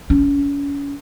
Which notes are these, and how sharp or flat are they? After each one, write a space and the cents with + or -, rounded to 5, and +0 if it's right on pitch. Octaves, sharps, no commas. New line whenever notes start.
C#4 +35